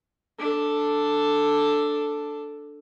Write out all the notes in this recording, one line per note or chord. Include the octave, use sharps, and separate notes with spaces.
D4 A4